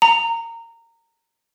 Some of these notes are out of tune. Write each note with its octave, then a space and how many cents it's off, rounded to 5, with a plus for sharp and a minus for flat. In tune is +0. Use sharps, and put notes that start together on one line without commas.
A#5 -20